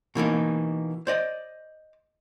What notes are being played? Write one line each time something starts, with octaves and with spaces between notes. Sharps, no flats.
B2 E3 A#3 D#4
C5 D5 D#5